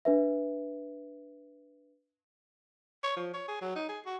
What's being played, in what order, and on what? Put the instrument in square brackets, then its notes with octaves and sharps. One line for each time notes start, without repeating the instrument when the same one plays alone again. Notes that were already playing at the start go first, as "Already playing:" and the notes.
[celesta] D4 B4 E5
[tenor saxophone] C#5
F3
C#5
G#4
F#3
D#4
G#4
F#4